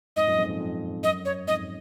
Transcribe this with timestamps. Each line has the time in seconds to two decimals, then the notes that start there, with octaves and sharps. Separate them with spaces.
0.16 F2 G#2 D#5
0.27 F#2 A#2
0.38 F2 G#2
0.49 F2
0.60 F2
1.03 F#2 D#5
1.25 C#5
1.47 F2 G#2 D#5